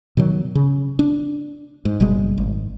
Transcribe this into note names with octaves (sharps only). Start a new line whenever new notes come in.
B2 D#3 F#3
C#3
D4
G#2
F#1 B2 G3 G#3
G#1